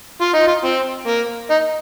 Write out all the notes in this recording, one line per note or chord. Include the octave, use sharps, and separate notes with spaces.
F4
D#4
F4
C4
A#3
D#4